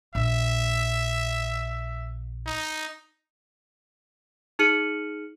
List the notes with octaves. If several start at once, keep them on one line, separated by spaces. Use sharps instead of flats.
A#1 E5
D#4
D#4 G#4 F6 C#7 D#7 F#7